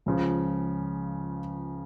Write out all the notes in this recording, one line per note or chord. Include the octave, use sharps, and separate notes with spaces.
C#2 C#3 F3